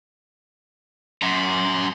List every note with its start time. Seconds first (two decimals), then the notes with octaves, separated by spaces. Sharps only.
1.22 F#2 A#5 C6